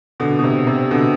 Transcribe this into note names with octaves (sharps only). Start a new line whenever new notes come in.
B2 D3
B2
C3
C3
B2 D3